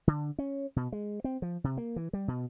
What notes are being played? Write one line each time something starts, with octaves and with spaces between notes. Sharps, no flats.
D3
C#4
B2
G#3
C4
F3
C3
A#3
E3
G3
B2